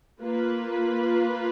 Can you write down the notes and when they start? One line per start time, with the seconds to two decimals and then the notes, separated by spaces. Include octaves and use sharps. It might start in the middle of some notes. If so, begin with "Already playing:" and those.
0.21 A#3 F4 B4